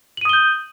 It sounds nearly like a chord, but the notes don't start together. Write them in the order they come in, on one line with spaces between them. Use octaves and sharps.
F#7 D#7 D#6 G7 G6